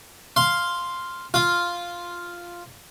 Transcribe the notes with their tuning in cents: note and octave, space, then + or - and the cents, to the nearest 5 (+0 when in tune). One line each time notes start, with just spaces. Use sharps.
F5 +0 C6 +0
F4 +0 F5 +0